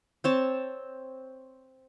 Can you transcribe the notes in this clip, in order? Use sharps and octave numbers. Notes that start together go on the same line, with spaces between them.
C4 C#5 A5